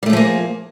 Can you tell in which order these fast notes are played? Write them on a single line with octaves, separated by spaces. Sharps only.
G3 A3 G#4 F3 A#3